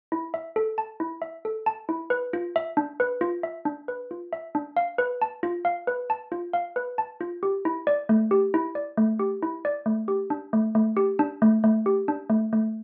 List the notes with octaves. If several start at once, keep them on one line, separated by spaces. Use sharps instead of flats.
E4
E5
A4
A5
E4
E5
A4
A5
E4
B4
F4
E5
D4
B4
F4
E5
D4
B4
F4
E5
D4
F5
B4
A5
F4
F5
B4
A5
F4
F5
B4
A5
F4
G4
E4
D5
A3
G4
E4
D5
A3
G4
E4
D5
A3
G4
D4
A3
A3
G4
D4
A3
A3
G4
D4
A3
A3